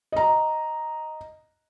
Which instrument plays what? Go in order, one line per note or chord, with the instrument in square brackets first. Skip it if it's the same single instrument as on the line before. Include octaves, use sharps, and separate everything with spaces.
[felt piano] D#5 A#5